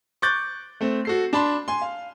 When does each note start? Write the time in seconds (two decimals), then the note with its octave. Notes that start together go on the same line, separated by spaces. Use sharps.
0.22 C#6 D6 F#6 G6 A6
0.81 A3 C4
1.05 F#4 A4 C7
1.33 D4 A5 B5 C6
1.68 G#5 C6
1.82 F5